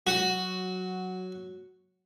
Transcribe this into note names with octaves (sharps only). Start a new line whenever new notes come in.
F#3 F#4